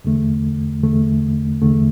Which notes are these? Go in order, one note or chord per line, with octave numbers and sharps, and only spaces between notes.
E2 D3 A3
E2 D3 A3
E2 D3 A3